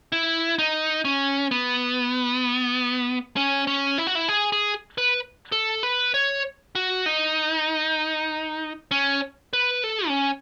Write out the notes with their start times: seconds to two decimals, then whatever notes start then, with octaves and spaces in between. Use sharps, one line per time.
0.12 E4
0.59 D#4
1.05 C#4
1.51 B3
3.36 C#4
3.67 C#4
3.98 E4
4.07 F#4
4.15 E4
4.29 G#4
4.52 G#4
4.98 B4
5.52 A4
5.83 B4
6.14 C#5
6.75 F#4
7.06 D#4
8.91 C#4
9.53 B4
9.84 A4
10.07 C#4